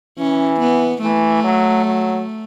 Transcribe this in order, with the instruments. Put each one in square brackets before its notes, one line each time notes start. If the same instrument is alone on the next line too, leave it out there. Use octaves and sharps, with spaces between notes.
[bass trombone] E3 [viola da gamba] C#4
[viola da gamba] B3
[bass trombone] E3 [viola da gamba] A3
[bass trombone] F#3
F#3